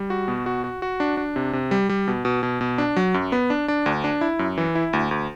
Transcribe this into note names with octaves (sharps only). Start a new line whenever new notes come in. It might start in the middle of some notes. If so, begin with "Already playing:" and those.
Already playing: G3
F#4
B2
F#4
F#4
F#4
D4
D4
C3
C3
G3
G3
B2
B2
B2
B2
D4
F#3
F#2
B3
D4
D4
D2
D4
E4
F#2
E3
E4
D2
D2